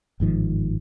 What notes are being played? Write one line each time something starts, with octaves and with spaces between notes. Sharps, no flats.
G1 G#2 D#3 F3